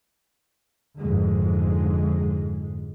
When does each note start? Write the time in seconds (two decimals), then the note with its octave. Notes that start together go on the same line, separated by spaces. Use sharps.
0.98 F2 G#2 D3 G#3